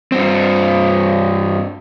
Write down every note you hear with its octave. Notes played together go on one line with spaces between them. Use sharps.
G2 C4